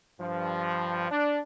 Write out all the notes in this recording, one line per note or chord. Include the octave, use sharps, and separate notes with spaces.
G2 F3
D4